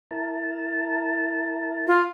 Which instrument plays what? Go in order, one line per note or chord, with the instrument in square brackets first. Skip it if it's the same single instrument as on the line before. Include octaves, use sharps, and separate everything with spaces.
[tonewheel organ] E4 A#4 A5
[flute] F4